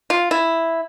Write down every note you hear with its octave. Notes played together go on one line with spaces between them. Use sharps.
F4
E4